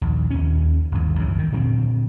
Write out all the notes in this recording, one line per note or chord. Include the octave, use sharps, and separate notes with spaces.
A#1 D#2
D#2 C#4
G1 D#2
C#2 F#2 E3 F#3
D#3
A#2 D3 F#3 C4